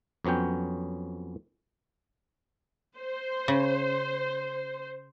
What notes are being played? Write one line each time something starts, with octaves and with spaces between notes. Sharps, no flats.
F2 F#3 B3 C#4 G5
C5
C#3